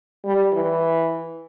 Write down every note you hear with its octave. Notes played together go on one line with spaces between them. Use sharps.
G3
E3